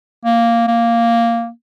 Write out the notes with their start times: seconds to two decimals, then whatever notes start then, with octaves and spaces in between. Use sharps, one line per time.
0.25 A#3
0.68 A#3